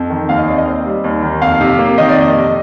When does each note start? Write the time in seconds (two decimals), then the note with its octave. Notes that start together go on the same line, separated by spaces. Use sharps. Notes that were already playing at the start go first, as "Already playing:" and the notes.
Already playing: F2
0.10 D#3
0.29 D#2 F5
0.38 D#5
0.48 D#3 D5
0.58 D#5
0.67 C4
0.86 G3
1.04 D#2
1.23 D#3
1.42 F2 F5
1.61 C3
1.79 A#3
1.98 D#3 D#5
2.09 D5
2.17 F2 D#5
2.36 C3